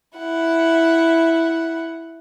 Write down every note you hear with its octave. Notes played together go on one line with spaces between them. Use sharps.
E4 F#5